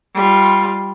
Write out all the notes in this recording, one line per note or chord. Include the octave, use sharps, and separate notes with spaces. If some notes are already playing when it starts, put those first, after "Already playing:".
G3 F4